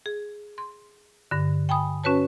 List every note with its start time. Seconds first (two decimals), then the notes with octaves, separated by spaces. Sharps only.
0.06 G#4
0.58 C6
1.31 G2 D3
1.69 G5 G#5 B5 D#6
2.04 C#4 F#4 B4 C#5 A5